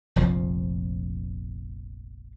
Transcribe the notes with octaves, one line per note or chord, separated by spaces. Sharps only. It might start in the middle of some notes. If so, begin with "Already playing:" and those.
F1 A#1 F2 F3